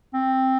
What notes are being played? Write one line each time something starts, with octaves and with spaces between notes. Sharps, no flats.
C4